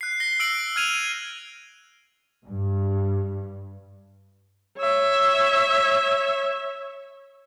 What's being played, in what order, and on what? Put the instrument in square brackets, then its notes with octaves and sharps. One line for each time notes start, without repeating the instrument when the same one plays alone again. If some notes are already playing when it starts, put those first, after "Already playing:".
[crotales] F#6 C7
A#6 C7 G7
E6 D7 F#7
F6 G#6 D#7 F7
[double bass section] G2
[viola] C#5 E5